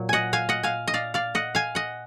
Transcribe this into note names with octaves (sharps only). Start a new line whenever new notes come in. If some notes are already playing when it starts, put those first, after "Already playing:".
Already playing: A#2 F#3
D#5 F#5 G#5
F5 G#5
D#5 F#5
F5 G#5
D#5
D5 F5
D5 F5
D#5 F#5
F5 G#5
D#5 F#5